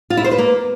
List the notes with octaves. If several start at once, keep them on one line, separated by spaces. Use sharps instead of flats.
F4
E4
C5
B4
A#3